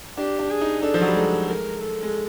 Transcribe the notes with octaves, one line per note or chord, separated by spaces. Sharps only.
D4 G4
D4
G#4
D#4
D4 A4
F3
F#3
G3
G#3 A4
A#4
A4
G#3